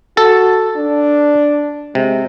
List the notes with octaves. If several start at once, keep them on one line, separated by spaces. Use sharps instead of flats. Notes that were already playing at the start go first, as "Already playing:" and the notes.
F#4 A4 A5
D4
C3 G#3